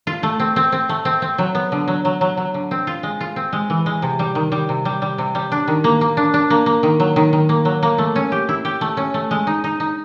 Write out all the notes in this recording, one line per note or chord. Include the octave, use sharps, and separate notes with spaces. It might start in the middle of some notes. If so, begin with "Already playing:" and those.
F4
A3
C4
C4
C4
A3
C4
C4
F#3
B3
D3
F#3
F#3
F#3
F#3
D3
C4
F4
G#3
F4
C4
G#3
E3
G#3
C3
G3
D#3
G3
C3
G3
G3
C3
G3
D4
D#3
A#3
A#3
D4
D4
A#3
A#3
D#3
F#3
D#3
D#3
A#3
F#3
A#3
A3
C#4
G4
E4
G4
A3
C#4
A3
G#3
D#4
D#4
D#4